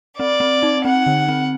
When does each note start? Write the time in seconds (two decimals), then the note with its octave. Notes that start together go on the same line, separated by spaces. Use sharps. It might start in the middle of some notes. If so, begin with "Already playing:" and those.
0.19 C4 D5
0.40 C4
0.63 D#4
0.85 C4 F#5
1.06 D3
1.28 C4